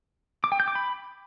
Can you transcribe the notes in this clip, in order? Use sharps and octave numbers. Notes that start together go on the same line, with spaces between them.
D6
G5
G6
D6
B5